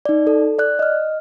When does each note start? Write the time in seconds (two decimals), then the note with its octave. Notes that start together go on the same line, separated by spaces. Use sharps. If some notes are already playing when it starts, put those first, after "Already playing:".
0.05 D#4 D5
0.27 A4
0.59 D5 F#6
0.79 D#5 F6